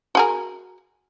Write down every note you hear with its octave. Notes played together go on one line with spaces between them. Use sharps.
F#4 G#4 A#4